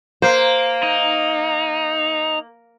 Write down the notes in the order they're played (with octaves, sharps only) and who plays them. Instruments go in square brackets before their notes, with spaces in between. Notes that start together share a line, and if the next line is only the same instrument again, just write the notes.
[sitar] A#3 [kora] C5
[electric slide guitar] D#4